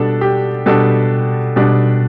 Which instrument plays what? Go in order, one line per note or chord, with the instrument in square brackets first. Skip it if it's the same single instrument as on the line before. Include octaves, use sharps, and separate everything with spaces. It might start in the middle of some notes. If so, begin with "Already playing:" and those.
Already playing: [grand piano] B2 G3 D4 A4
G4
B2 G3 D4 A4
B2 G3 D4